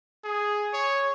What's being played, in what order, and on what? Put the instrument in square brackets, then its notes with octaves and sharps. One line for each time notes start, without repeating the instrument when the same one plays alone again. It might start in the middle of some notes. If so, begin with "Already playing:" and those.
[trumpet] G#4
C#5